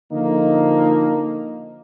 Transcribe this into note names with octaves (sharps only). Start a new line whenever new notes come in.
D3 F3 A#3 D#4